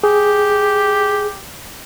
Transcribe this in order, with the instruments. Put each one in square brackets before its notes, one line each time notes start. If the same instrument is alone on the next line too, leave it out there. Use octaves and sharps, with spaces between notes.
[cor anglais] G4 [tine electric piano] G#4